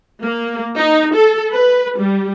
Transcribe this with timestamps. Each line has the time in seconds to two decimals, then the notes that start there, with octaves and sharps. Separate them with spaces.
0.22 A#3
0.76 D#4
1.16 A4
1.52 B4
1.97 G3